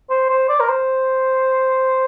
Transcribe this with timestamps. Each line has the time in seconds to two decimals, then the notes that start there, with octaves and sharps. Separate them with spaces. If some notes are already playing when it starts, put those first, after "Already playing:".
0.10 C5
0.30 C5
0.49 D5
0.60 A#4
0.69 C5